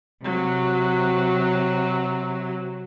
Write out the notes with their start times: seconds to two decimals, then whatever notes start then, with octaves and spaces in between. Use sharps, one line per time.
0.21 C3 F#3